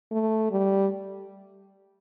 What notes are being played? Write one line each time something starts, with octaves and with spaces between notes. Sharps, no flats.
A3
G3